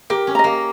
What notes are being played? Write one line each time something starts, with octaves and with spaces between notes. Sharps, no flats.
G4 A#4
C#4
D#5 A#5
A#3